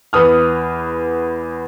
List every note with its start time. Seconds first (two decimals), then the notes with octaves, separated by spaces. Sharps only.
0.13 E2 B4 D#6 F6